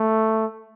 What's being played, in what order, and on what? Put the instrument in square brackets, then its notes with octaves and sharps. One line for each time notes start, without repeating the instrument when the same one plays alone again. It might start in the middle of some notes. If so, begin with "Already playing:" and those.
Already playing: [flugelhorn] A3